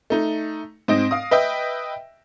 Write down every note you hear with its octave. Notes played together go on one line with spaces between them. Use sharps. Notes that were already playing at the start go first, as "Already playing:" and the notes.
A3 D#4
G#2 C4 D#5 A#6 D7
F5 D#6
B4 D#5 E5 G5